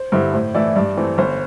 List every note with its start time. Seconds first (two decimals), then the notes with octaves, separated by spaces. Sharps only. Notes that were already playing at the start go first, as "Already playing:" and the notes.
Already playing: C5
0.12 G2 D3 C4 E4
0.34 A2 C5
0.54 E3 A3 E4 D5
0.76 G2 D5
0.97 E3 A3 C4
1.18 G1 C5